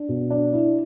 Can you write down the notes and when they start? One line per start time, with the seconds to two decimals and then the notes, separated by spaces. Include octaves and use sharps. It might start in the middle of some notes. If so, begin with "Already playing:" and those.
Already playing: D4
0.09 B2
0.31 D4
0.53 E4